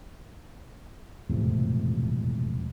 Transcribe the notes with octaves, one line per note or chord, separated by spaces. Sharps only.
E1 F2 A2 C3